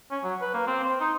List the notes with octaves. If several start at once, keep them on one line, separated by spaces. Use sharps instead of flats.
C#4
F#3
B4
A#3
C4
C5
D#4